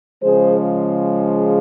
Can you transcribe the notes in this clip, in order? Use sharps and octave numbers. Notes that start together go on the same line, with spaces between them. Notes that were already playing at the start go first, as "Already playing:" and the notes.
C#3 F3 G#3 G#4 C5